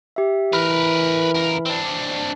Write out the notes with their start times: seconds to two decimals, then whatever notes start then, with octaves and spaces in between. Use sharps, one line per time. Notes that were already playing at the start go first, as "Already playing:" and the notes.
0.16 G4 E5
0.53 E3 A#4 B4 B5 F6
1.35 C#2 A#4
1.66 C4 D4